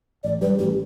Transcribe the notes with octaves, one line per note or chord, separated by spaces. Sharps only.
A1 D5
G2 G3 B4
A1 G4